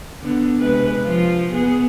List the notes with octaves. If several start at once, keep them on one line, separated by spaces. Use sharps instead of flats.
D3 B3
C3 G#3 B4
F3 F4
B3 G#4